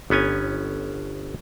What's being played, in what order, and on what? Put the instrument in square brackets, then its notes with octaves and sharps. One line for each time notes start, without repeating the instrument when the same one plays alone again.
[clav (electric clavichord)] G1 B3 C#4 G#5 A#5